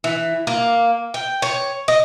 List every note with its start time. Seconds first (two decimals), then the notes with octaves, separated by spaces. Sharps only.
0.04 E3
0.47 A#3
1.14 G5
1.42 C#5
1.88 D#5